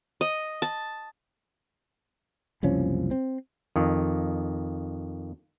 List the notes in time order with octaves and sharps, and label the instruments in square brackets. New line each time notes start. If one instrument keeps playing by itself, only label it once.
[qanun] D#5
A5
[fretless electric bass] F#1 C2 F3 C#4
C4
[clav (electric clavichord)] F2 D#3